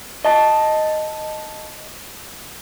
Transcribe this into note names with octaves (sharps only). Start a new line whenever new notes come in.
D#5 A5